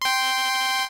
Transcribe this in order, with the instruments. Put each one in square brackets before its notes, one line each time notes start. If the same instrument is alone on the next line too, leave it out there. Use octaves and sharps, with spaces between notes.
[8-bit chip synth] G5 C6